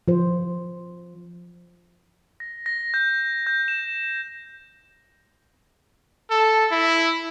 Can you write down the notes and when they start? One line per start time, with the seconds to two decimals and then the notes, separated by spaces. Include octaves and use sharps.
0.08 F3 C5
2.40 A#6
2.66 A#6
2.94 G6
3.47 G6
3.68 E7
6.31 A4
6.71 E4